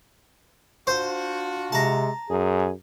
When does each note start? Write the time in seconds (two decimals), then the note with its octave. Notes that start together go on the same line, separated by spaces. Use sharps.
0.87 D4 F4 F#4 C5
1.72 C3 G#3 A5 A#5
2.30 F#2 G#4